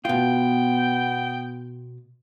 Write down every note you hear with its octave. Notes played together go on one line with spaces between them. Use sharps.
B2 B3 F4 G5